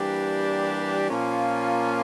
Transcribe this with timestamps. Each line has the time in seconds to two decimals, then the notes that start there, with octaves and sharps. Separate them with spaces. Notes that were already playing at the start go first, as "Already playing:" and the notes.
Already playing: E3 G3 A#3 D4 G4
1.09 A#2 F3 A#3 C#4 F4